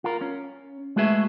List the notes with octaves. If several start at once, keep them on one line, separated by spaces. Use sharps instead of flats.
F4 A#4
C#4
G#3 A3 F#4 G#4 B4 E5